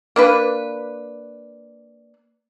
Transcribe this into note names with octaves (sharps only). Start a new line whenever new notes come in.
A#3 D4 B4